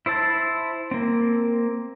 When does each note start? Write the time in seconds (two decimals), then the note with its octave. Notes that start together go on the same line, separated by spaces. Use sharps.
0.06 E4 C5 E5 A5
0.91 A#3 C4